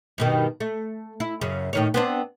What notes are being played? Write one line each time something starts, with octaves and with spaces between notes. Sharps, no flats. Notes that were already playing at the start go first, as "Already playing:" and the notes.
G2 B2 D#3
A3
E4
F#2 C#3
A2 D#3 C#5
B3 C4 D4